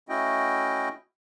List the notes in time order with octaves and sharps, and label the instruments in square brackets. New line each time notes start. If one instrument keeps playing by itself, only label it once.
[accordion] A3 C#4 E4 F#4 D#5 G5